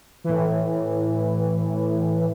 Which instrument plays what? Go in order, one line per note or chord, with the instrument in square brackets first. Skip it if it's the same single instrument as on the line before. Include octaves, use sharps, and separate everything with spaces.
[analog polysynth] A2 E3